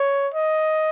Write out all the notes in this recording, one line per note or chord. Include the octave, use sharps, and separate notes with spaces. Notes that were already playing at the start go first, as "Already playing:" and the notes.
Already playing: C#5
D#5